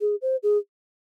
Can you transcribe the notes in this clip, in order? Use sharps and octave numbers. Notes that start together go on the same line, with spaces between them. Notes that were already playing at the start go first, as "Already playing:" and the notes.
G#4
C5
G#4